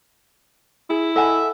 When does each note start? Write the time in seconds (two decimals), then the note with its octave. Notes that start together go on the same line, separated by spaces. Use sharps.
0.90 E4 G#4
1.16 A4 D#5 E5 F#5 G#5 B5